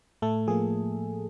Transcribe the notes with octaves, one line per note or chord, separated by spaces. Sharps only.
A2 A3 A4
F3 A#3 G#4